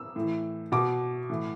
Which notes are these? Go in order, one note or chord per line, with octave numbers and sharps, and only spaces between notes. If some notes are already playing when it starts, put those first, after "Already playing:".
Already playing: E6
A2 E3
B2 D6
A2 E3